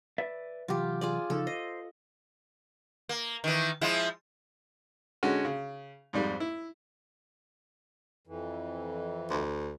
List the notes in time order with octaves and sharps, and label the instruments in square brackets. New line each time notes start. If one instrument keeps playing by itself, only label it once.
[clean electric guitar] B4 D5 E5
[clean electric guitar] C3 E3 F#3 [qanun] F4 G4
[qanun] F4 G#4 D5
[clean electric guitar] C#3 F3 D#4 [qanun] A4
[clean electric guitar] C5 [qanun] D#5
[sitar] A#3
D#3 E3
F3 G#3 E4
[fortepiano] D3 G#3 C#4 F#4
C#3
F2 G#2 G3
E4
[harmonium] F2 E3
[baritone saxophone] D2